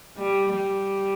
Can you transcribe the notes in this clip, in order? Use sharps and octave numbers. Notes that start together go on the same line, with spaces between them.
G3
G3